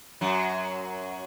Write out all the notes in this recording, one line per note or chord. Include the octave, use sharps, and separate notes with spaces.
F#2 F#3